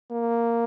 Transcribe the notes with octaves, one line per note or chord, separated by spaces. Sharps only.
A#3